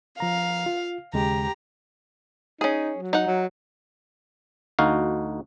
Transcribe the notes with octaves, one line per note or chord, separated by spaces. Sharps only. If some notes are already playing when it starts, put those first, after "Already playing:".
F3 F5 A#5
F4
D#2 C#3 G#3 G4 A#5
C#4 D#4 G#4
F#3
D#4 F#5
F#3
D2 D#4 F#4 F5